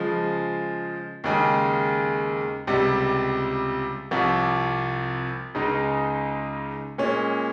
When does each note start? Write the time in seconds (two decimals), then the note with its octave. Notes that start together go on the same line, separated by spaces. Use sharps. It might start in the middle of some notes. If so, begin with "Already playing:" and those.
Already playing: C#3 F3 G#3
1.24 D#2 C#3 G#3
2.67 C#2 C3 G3
4.11 C2 C3 F3
5.55 C#2 C#3 G#3 D#4
6.98 A#2 G#3 C#4